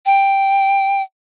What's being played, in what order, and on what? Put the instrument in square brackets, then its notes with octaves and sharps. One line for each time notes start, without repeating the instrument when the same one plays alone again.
[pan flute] G5